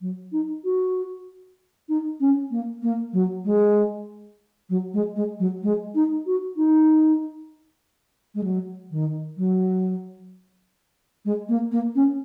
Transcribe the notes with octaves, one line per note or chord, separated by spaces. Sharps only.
F#3
D#4
F#4
D#4
C#4
A#3
A#3
F#3
G#3
F#3
G#3
G#3
F#3
G#3
D#4
F#4
D#4
G#3
F#3
D#3
F#3
G#3
A#3
A#3
C#4